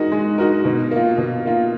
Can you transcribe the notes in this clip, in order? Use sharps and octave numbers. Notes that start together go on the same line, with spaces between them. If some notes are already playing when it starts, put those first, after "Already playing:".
Already playing: G#3 D#4 F#4 A#4
G#3
D#4 F#4 A#4
B2
A#3 F4
B2
A#3 F4